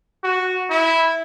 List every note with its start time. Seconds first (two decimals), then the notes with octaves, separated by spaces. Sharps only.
0.24 F#4
0.70 E4